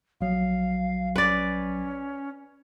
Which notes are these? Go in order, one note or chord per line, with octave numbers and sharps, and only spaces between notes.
A#1 F#3 F5
C#4 B4 D5